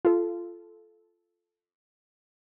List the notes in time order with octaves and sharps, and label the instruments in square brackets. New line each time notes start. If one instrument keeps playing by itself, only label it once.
[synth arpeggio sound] F4 A4